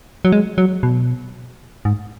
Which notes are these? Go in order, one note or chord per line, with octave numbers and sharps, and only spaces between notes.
F#3
G#3
F#3
B2
G#2